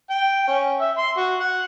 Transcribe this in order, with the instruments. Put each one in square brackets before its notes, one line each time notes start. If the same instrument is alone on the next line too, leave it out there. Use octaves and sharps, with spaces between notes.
[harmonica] G5
C#4
E5
C6
F#4
F#5